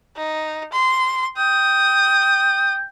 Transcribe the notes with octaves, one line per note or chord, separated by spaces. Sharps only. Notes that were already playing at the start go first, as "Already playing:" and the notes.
D#4
C6
G5 D#6